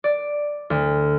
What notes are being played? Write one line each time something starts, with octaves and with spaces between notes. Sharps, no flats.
D5
D2